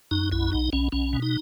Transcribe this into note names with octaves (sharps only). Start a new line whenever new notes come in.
F#2 D#4
B1 E4
B1 D#4
B1 C#4
B1 C#4
B2
D#4